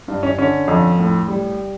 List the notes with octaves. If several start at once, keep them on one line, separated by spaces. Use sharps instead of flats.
G2
C#4
D3 C#4
F2
A2
G3